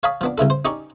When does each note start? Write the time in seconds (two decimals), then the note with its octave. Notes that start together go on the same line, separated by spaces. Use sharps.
0.03 C#5 F5 A5 B5 D#6
0.21 F3 B3 D4
0.38 C2 C#3 E4 A4
0.50 C5
0.65 C#4 D#4 G4 D5 C#6